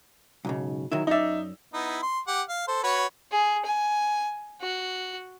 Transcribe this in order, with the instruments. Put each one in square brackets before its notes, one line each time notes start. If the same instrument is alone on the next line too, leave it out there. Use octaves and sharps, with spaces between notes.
[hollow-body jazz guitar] B1 G#2 C#3
D#3 F#3 E4
[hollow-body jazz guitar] F#2 D5 [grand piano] D#4 E5
[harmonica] B3 D#4 E4
C6
G4 F#5 D6
F5
A4 C5
F#4 B4 C#5
[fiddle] G#4
G#5
F#4